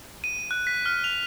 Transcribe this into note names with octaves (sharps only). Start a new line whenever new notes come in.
D#7
F#6
B6
F6
F7